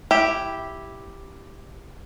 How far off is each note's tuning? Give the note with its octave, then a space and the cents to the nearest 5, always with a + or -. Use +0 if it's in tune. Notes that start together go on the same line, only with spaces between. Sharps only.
E4 +0 G4 +0